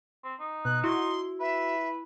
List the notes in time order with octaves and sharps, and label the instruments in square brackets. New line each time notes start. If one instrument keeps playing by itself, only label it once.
[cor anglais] C4
D#4
[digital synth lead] B2 [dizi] F#6
[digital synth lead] E4 [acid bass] F#4 [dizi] C6
[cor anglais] B4 [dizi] E5